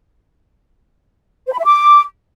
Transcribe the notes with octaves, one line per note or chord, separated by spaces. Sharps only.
C5
B5
E5
D6